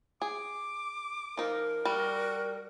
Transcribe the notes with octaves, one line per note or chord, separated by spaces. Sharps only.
G#4 D6
F3 D#4 A#4
G3 F#4